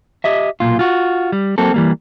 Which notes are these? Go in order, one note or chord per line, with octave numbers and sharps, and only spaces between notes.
G4 D#5 E5
B1 A#2 F4
F4 F#4
G3
F#3 A#3 C4 A4
E3 G3 A#3